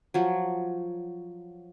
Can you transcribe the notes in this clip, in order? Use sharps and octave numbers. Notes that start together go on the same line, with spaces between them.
F3 F#3